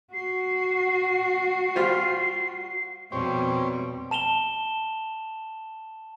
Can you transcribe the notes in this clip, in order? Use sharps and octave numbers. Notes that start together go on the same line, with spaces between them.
F#4 C7
G3 F4 C5
F2 B2 G3 G4 C5 C#5
A5 E7 F7 G7